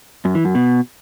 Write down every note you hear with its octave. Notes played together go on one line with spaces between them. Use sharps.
F#2
E3
F#2
B2